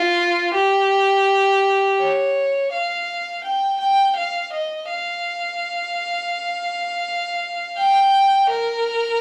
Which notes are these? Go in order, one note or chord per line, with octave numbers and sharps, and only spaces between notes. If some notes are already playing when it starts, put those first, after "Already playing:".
Already playing: F4
G4
C#5
F5
G5
G5
F5
D#5
F5
G5
A#4